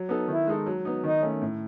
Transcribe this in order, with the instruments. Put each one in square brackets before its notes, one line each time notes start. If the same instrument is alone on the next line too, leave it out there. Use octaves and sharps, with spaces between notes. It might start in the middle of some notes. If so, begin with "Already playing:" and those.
Already playing: [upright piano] F#3
B3 D#4 A4
[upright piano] D#3 [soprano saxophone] E4
[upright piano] G#3 D#4 A4
F#3
B3 D#4
[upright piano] D#3 [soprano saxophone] D#4
[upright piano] A3 C#4
A2